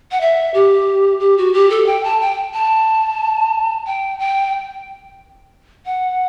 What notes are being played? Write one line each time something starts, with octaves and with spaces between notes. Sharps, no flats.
F#5
E5
G4
G4
F#4
G4
A4
G5
A5
G5
A5
G5
G5
F#5